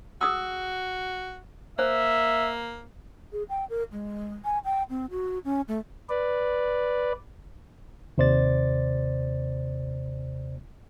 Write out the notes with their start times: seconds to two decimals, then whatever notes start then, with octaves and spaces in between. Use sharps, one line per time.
0.21 F#4 G#4 D#6 E6
1.79 A#3 C5 E5
3.32 G#4
3.49 G5
3.70 A#4
3.92 G#3
4.45 G#5
4.64 G5
4.90 C4
5.11 F#4
5.44 C#4
5.68 A3
6.09 B4 D5
8.18 D#2 C3 C5 D5 A6